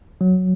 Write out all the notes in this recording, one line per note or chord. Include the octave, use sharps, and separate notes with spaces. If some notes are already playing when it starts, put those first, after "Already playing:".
F#3